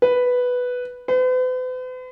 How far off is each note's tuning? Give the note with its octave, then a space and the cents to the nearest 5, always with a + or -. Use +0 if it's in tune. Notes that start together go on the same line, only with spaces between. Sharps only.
B4 +0
B4 +45